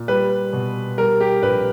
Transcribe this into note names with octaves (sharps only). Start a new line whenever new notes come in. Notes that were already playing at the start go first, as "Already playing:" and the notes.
Already playing: A#2
G3 B4
B2
G3 A#4
G4
A#1 B4